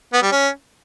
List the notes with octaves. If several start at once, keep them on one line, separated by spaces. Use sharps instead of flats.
B3
G3
C#4